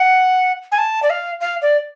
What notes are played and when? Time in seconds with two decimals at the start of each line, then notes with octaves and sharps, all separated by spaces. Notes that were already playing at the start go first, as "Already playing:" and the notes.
Already playing: F#5
0.72 G#5
0.78 A5
1.03 D5
1.10 F5
1.41 F5
1.62 D5